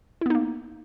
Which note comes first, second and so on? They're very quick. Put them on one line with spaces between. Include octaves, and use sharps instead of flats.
E4 B3 D#4 A#3